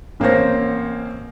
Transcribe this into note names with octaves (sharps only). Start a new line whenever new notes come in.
A1 A#3 C4 C5 C#5 A#6